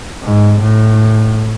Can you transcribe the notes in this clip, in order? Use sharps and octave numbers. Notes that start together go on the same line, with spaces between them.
G#2
A2